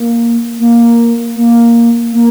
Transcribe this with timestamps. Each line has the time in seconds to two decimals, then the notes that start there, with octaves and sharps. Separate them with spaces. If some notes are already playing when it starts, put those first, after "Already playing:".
Already playing: A#3
0.59 A#3
1.36 A#3
2.13 A#3